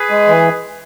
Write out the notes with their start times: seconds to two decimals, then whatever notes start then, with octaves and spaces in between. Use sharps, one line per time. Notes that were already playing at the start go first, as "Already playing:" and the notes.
Already playing: G#4 B4
0.11 G#3
0.28 E3